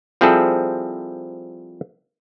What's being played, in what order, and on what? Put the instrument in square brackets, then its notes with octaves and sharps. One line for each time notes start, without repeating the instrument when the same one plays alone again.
[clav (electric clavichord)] F3 G3 C4 E4 G#4 A4